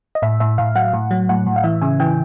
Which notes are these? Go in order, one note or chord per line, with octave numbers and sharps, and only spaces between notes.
D#5
A2 E5
A2 E5
A2 F5
F#3 F#5
A2
F#3
A2 F#5
A2
F5
E3 E5
C#3 G#5
E3 G5